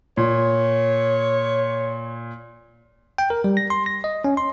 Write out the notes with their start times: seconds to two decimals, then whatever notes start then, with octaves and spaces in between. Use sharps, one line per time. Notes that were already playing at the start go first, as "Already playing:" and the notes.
0.17 A#2 C#5
3.18 G5
3.30 A#4
3.44 G3
3.57 A#6
3.70 C6
3.86 A#6
4.04 D#5
4.24 C#4
4.37 C6